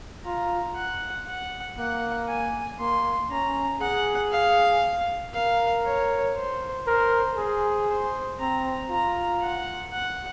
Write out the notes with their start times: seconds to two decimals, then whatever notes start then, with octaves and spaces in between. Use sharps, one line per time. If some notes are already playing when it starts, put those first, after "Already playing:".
0.25 F4 A#5
0.76 F#5
1.27 F#5
1.78 A#3 F#5
2.28 G#5
2.80 A#3 C6
3.30 C#4 A#5
3.81 G#4 F#5
4.32 F5
5.33 A#4 F5
5.85 C#5
6.36 C5
6.87 A#4 C5
7.37 G#4 C5
7.88 C5
8.39 C4 A#5
8.90 F4 A#5
9.41 F#5
9.92 F#5